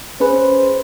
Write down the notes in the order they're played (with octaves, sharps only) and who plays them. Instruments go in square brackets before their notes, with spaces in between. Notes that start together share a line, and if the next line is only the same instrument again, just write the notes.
[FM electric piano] C#4 G#4 B4 [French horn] C5